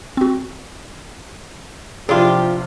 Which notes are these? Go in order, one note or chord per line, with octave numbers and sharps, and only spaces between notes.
C4 F#4
C3 F3 D4 E4 F4 G4 G#4